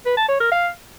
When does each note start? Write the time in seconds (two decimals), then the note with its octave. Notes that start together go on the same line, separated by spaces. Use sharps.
0.06 B4
0.17 A5
0.29 C#5
0.40 A#4
0.52 F5